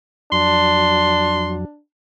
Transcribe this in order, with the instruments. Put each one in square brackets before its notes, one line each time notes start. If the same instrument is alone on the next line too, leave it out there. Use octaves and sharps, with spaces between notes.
[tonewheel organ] F2 F#3 [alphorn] D4 [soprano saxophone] C6